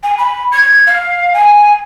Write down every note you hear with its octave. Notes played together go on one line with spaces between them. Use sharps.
G#5
B5
G#6
F5
G#5